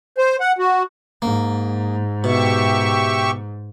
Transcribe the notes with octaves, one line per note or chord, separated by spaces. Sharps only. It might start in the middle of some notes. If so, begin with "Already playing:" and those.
C5
F#5
F#4
G#2 A#3
B2 G4 E5 C#6